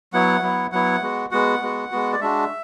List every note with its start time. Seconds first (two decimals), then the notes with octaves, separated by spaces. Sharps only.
0.13 F#3 B3 E4 F#5
0.42 F#3 B3 E4
0.72 F#3 B3 E4 F#5
1.02 G#3 B3 F#4
1.31 G#3 B3 F#4 F#5
1.61 G#3 B3 F#4
1.91 G#3 B3 F#4
2.13 D5
2.21 G#3 D4 F#4 E5